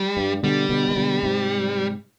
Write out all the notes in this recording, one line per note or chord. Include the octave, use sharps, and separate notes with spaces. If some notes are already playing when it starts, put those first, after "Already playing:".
Already playing: G3
G2
B2 D3 G3
B2 D3
D#3
B2 D3
G#2 C3